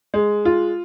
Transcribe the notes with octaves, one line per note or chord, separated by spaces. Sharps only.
G#3
F4